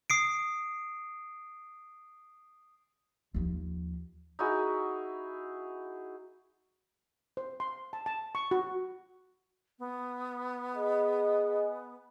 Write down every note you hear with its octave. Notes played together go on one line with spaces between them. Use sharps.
D#6 C7 D7
D#2 F3
D#4 E4 F#4 G#4
C5
C6
A5
A5
C#6
F#4
B3
G#4 D#5